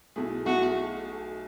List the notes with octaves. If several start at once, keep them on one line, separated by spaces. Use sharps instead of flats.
B1 B2 A3 E4 G#4
B1 B2 A3 E4 F#4 G#4